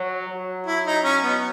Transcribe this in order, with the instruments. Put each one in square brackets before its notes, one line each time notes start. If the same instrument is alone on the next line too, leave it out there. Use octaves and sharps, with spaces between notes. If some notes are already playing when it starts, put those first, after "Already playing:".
Already playing: [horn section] F#3
F#3
[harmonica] E4
D#4
C#4
B3